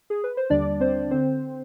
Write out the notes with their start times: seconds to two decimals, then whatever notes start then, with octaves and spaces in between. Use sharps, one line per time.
0.10 G#4
0.24 B4
0.37 C5
0.50 D#2 D3 G3 D4 D5
0.80 C4 C5
1.11 D3 C4 C5